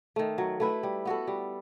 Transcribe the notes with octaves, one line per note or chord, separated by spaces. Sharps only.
D#3 A3
F#3
A3 E4 B4
G3
B3 F#4 A4
G3